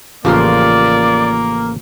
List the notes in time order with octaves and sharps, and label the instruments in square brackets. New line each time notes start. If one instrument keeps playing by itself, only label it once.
[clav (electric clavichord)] A1 C#3 [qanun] F3 G4 C6 [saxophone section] A#3 [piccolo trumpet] D5